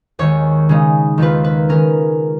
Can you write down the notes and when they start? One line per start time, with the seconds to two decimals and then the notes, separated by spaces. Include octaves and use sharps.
0.19 D#2 D#3 G#3 C#5
0.69 C#3 G#3 D#4
1.18 D#2 D#3 A#3 F4 B4
1.44 B4
1.69 D#3 G#3 C#4 A#4